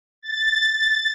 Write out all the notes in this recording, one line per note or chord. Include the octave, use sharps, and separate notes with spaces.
A6